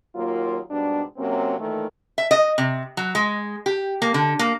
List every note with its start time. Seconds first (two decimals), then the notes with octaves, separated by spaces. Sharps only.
0.15 D#2 F#3 A#3 F4
0.70 G#2 B2 G3 D4
1.17 C3 F#3 A#3 C4 C#4
1.58 A#2 D#3 E3 A3
2.18 E5
2.31 D#5
2.58 C3
2.97 F#3
3.15 G#3
3.66 G4
4.02 A#3
4.14 D3
4.39 A#3